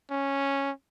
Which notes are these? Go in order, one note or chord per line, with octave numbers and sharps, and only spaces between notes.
C#4